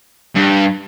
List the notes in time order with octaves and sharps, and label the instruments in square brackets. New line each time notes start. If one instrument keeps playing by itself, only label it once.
[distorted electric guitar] G2